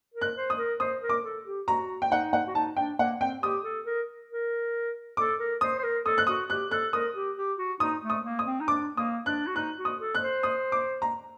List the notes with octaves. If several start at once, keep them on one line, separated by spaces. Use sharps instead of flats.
A#4
F#6
C5
D#6
A#4
C5 D#6
A#4
D6
A4
G4
F#4 A#5
G5
D#4 F#5
F#5
F#4
D#4 A5
D4 G5
A#3 F#5
C4 G5
G4 D#6
A4
A#4
A#4
A4 D6
A#4
C5 D#6
C5
A#4
A4 D#6
F#6
F#4 D#6
G4 F#6
A4 F#6
A#4 D#6
G4
G4
F#4
D#4 D#6
A3
D#6
A#3
D#6
C4
D#4
D4 D6
A#3 D#6
D4 F#6
F#4
D#4 F#6
F#4
D#6
A4
F#6
C5
D#6
D6
A#5